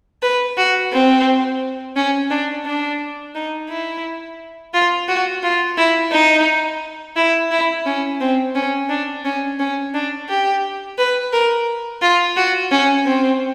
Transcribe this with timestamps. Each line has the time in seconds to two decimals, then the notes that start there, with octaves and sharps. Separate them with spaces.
0.22 B4
0.57 F#4
0.92 C4
1.96 C#4
2.31 D4
2.66 D4
3.35 D#4
3.69 E4
4.74 F4
5.08 F#4
5.43 F4
5.78 E4
6.12 D#4
7.16 E4
7.51 E4
7.86 C#4
8.20 C4
8.55 C#4
8.90 D4
9.25 C#4
9.59 C#4
9.94 D4
10.29 G4
10.98 B4
11.33 A#4
12.02 F4
12.37 F#4
12.71 C#4
13.06 C4